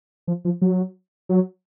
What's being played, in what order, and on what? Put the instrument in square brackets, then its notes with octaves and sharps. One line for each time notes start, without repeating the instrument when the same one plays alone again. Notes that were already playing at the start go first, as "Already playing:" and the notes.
[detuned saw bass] F3
F3
F#3
F#3